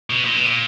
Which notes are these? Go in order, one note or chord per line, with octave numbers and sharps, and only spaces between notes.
B2
A#2
B2
A#2